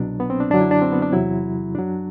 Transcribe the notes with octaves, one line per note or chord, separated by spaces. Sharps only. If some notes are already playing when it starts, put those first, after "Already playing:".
Already playing: C2 B2 F#3 D4
B3
C4
D4
F#2 D3 F#3 D4
E4
D4
C4
B3
D4
E2 C3 F#3 E4
F#2 F#3 D4